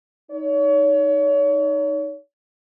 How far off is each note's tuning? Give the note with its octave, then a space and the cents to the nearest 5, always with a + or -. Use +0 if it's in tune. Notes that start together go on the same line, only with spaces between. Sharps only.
D#4 +0 C#5 +35